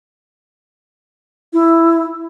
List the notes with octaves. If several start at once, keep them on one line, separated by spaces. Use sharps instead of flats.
E4